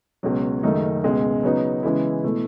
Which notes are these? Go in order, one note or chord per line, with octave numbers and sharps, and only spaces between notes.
C#2 B2 F#3
F#1 F#2 D#3 A3 D#4
C#2 B2 G#3
C#3 F#3 B3 D#4
C#3 E3 G#3 B3 E4
B2 A3 E4